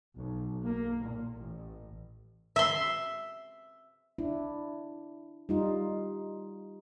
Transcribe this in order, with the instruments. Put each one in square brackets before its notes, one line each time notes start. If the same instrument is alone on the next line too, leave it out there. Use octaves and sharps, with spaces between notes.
[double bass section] B1
A#3
A#2
A1
[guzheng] E5 C6
[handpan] D4 E4
G3 D#4 F4